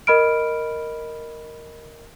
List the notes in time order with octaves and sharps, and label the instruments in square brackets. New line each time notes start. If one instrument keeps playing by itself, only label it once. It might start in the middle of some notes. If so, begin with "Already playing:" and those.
[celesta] A#4 D#5 B5 F6 D7